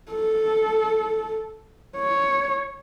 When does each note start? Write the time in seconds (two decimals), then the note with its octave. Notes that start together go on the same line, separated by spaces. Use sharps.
0.11 A4
1.97 C#5